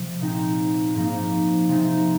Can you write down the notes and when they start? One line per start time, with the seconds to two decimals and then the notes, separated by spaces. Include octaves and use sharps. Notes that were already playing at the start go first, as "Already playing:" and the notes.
Already playing: C3 F3
0.20 A#2 G#3 C4 D#4
0.94 G#2 F3 A#3 D#4
1.68 C3 F3 G#3 D#4